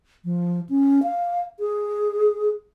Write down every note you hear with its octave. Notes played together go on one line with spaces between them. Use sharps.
F3
C#4
F5
G#4